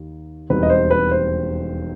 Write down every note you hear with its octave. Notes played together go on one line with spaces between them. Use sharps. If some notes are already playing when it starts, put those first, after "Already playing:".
Already playing: D#2 D#3
E1 D#2 D#3 G3 C4 B4
D#5
C5
B4
C5